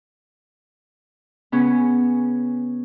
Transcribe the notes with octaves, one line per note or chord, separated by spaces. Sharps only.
C#3 B3 C#4